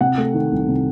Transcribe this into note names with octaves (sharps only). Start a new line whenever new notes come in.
C3 F#5
A3
D#3
C2
C3